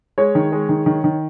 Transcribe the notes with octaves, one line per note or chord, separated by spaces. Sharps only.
G#3 C#5
D#3
G#3
D#3
D#3
D#3